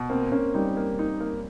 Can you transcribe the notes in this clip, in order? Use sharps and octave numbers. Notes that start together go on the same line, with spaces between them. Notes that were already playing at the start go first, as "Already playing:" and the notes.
Already playing: B2
A#3 C4
A#3 C#4
G3 D#4
A#3
D#4
A#3